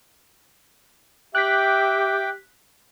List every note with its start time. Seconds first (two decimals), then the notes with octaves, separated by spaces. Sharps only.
1.35 G4 E5 G5 D6 F#6 B6